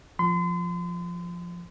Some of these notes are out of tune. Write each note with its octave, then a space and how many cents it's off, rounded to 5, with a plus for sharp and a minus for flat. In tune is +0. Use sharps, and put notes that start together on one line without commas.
F3 +0 C6 -40